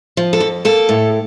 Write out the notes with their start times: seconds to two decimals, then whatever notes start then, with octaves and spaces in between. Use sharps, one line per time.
0.17 F3
0.33 A4
0.40 F2
0.65 A#3 A4
0.89 A2